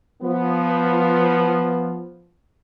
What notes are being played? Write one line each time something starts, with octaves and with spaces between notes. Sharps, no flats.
F3 B3